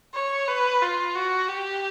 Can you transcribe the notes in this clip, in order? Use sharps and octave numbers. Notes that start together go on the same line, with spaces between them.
C#5
B4
F4
F#4
G4